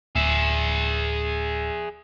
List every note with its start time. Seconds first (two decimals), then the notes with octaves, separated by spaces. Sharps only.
0.16 D1 G#4 E5